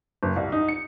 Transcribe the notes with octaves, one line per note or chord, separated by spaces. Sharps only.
F#1
C2
D#4
C#7